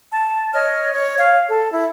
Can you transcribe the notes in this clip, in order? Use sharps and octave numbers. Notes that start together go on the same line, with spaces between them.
A5
C#5 D#5 F6
C#5
C#5 F5
A4
E4